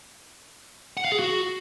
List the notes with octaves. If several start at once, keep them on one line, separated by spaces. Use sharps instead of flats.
F#5
F5
G#4
F#4